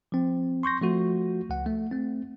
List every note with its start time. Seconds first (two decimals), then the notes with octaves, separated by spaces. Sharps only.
0.12 F3 C4
0.63 C6 C#6 G6 A#6
0.82 F3 A3 F#4
1.49 C#2 F#5
1.66 A3
1.91 A3 C4